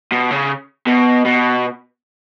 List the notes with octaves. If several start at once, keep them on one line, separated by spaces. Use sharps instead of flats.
B2
C#3
B2
B2